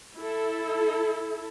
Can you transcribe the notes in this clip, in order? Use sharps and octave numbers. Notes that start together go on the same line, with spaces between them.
E4 A4